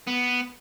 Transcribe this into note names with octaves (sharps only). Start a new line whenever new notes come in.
B3